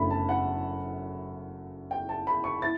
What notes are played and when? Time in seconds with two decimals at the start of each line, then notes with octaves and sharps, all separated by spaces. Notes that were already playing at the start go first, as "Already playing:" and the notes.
Already playing: F#1 F#2 D3 F#3 A3 B5
0.11 A5
0.29 F#5
1.91 G5
2.09 A5
2.27 B5
2.44 C#6
2.62 E4 A6